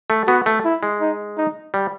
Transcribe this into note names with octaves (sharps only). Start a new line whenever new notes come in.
A3
B3 F#4
A3
E4
G#3
D#4
D#4
G3